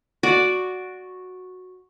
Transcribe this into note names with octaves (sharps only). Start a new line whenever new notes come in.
F#4 D5